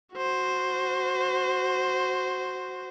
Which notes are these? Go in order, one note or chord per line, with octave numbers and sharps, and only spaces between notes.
F#4 C5